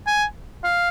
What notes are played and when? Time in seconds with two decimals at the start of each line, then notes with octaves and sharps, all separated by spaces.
0.07 G#5
0.64 F5